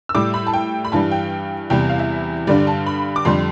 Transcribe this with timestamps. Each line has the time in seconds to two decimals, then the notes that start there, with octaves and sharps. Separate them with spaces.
0.09 E6
0.15 A2 G3 D6
0.34 B5
0.47 A5
0.53 G5
0.85 B5
0.92 G2 E3 G3 A5
1.11 G5
1.70 E2 C3 G3 G5
1.89 F5
1.99 E5
2.47 G2 D3 G3 D5
2.67 A5
2.86 B5
3.16 D6
3.25 F2 D3 G3 C6